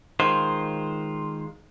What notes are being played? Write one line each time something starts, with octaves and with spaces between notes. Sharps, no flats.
D#3 G#3 F4 C5